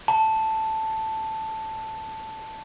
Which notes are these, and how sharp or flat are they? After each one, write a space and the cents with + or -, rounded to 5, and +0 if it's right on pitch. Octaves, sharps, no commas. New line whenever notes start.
A5 +0